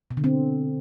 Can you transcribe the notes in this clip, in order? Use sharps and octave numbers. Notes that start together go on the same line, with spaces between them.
B2
D3
C4